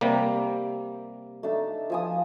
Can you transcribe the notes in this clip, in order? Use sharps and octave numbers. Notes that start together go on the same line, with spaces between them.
C3 G3 A#3
A3 D4 D#4
F3 G#5 D#6